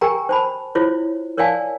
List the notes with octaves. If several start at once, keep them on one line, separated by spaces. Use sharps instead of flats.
G4 A#4 G5 G#5 A#5
C5 A5 B5
E4 F4 C5 C#5
A#4 C#5 D5 F5 G#5 A5